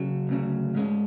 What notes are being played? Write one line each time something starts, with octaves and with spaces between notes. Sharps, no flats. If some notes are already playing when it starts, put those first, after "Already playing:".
Already playing: C#3 F#3
D2 C#3 F#3
G#2 G#3 C#4